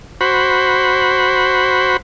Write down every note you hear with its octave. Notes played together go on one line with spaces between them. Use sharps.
F#4 C5 B5